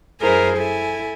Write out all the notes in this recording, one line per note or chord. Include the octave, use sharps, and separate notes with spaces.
F#2 E4 G#4 A#4 C5 G#5
E4 A4 G#5